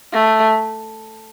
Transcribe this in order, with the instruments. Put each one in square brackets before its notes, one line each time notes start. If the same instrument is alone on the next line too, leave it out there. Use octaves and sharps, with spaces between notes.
[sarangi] A3